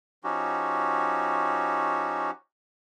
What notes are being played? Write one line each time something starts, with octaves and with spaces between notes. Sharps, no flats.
F3 C#4 D#4 F#4 G4